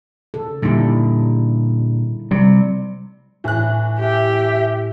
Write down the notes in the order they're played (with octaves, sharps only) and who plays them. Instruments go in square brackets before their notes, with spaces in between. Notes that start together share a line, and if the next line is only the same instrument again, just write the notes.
[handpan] C#3 A4
[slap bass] A#2 D3 [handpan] G3 D#4 E4
[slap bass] C3 [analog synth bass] G3
[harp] A2 [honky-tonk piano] E3 F#6
[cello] G4 [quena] E5